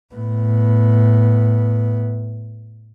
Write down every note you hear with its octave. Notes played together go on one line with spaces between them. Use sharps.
A2 B3